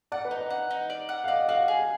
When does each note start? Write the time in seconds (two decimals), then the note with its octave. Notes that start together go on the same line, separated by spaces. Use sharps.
0.12 D5 F#5
0.25 B4
0.31 D#4
0.37 D5
0.50 F#5
0.71 D#4
0.90 D5
1.09 F#5
1.24 F5
1.28 D5 D#5
1.48 F#4 F5
1.68 G#4